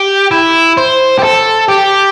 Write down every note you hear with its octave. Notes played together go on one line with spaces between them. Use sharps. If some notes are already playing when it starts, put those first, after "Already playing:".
Already playing: G4
E4
C5
G4
A4
G4